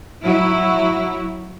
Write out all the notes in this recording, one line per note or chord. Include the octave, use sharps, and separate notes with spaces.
F#3 E4